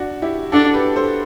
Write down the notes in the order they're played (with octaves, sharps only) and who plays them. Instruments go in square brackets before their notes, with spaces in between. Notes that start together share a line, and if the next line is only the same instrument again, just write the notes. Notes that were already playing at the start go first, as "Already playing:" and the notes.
Already playing: [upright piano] D4 F#4
E4 G4
[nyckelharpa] D4 [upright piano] F#4 A4
[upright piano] G4 B4
A4 C5